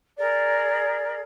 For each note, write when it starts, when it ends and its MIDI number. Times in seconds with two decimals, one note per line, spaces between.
0.17 1.20 68
0.17 1.20 70
0.17 1.20 74